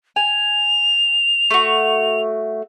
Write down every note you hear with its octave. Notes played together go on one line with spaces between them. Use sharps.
G#5 F7
A3 F#4